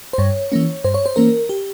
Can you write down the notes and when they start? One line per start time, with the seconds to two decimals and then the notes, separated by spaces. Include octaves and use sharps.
0.13 C5
0.18 G2 C#5
0.52 E3 A#3 C#4
0.84 G2 C5
0.94 C#5
1.06 C5
1.16 E3 A#3 C#4 A#4
1.49 G4